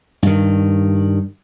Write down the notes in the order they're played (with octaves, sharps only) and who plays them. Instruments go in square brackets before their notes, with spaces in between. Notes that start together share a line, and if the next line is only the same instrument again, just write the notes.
[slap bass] G2 D#3